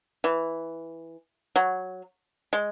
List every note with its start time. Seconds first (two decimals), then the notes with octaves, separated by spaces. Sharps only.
0.24 E3
1.56 F#3
2.53 G#3